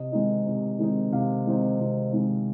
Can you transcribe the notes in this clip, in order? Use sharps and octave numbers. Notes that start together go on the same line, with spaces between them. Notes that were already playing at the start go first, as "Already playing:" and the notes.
Already playing: C3 D#5
D#3 G#3 C4 D#4
C3
D#3 G#3 C4 D#4
C3 F5
D#3 G#3 C4 D#4
C3
D#3 G#3 C4 D#4